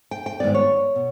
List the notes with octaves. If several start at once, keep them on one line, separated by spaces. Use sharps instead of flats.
G5
G5
G#2 D#3 G3 B3 D5
C#5
B2